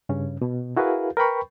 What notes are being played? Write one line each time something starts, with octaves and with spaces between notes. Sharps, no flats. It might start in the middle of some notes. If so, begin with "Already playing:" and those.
G2 C#3 C#4
B2
E4 F#4 G#4 A#4 B4 F5
A#4 B4 G5 B5 C#6